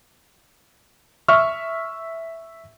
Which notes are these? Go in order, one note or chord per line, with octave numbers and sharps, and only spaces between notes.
E5 C#6 E6 F6